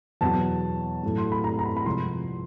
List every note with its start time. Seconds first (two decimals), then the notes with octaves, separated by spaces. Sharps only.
0.21 E2 B2 F#3 A5
1.03 A2 F#3
1.18 C6
1.32 B5
1.44 A#5
1.59 A#5
1.66 B5
1.77 B5
1.85 C2 C3 F3 G#3 C6